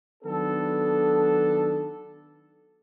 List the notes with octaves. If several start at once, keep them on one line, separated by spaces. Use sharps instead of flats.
D#3 F#3 B3 D4 A4